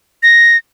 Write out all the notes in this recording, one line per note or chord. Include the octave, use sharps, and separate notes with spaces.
A#6